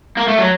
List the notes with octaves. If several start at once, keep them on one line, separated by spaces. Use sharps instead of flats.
A#3
A3
F#3